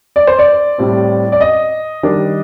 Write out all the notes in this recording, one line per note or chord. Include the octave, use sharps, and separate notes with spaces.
D5
C5
D5
A2 G3 C4
D5
D#5
D#3 G3 D4